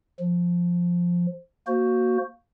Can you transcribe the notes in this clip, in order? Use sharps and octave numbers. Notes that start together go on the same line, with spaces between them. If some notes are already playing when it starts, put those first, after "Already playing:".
F3
A#3 F#4 C5